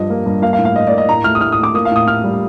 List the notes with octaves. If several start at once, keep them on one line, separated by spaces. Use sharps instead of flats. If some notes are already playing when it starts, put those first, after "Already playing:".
Already playing: G2 F3 D#5
A#3
G2
A#3 F5
F5
A2
F5
A2 D#5
D5
A#3
D#5
A2 A#5
A3 F6
D#6
A2 F6
D#6
A3
D6
A#3 D#6
F5
A2 D#6
A2 F6
G3